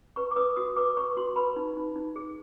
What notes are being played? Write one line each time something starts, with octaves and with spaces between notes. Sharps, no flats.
B4 C#6
D6
B4 D#6
F#4 D#6
B4 D6
B4 C#6
F#4 C6
B4 B5
D#4
D#4
D#4
G#4